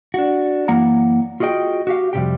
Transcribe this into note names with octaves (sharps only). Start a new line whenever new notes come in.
D4 F#4
F#2 E3 A#3 F#5 A#5
F4 F#4 G#4 D#5 G5
F#4 G4 F5
F2 C3 F3 G3 G4 G5